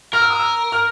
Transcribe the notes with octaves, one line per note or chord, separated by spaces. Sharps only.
A#4 F6
E6
D#6
E6
F6